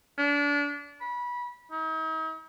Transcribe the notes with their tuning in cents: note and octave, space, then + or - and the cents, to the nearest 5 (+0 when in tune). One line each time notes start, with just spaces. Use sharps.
D4 -30
B5 -20
D#4 +45